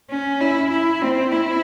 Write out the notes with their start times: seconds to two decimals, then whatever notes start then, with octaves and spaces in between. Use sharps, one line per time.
0.10 C#4
0.41 E4
0.71 E4
1.02 C4
1.32 E4